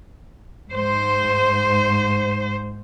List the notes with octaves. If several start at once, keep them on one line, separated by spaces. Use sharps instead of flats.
G#2 C5